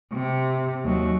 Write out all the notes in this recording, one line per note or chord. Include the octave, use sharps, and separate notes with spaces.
C3
D#2 F#3